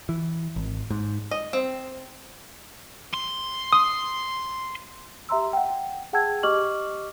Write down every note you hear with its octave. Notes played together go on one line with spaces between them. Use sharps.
E3
G#1
G#2
D#5
C4
C6
D#6
G4 E5 A#5 C6 E6
F#5 G5
G#4 F#5 G5 A5 E6 G#6
G4 D#5 C#6 D6 F6 F#7